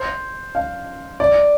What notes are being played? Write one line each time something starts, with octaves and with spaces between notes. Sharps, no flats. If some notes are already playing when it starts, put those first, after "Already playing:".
Already playing: C5
F5
D5